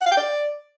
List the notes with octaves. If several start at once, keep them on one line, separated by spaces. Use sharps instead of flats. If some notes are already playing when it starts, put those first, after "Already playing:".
F#5
F5
G5
D5